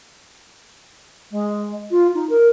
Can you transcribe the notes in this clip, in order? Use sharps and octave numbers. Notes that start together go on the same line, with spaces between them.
G#3
F4
D#4
A#4